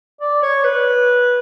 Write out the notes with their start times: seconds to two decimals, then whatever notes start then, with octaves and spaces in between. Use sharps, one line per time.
0.21 D5
0.43 C#5
0.64 B4